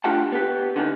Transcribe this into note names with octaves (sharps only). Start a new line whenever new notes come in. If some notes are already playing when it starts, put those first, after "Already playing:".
A3 D4 F4 G4 F#5 A5
B3 G4
D3 B3 C#4 D#4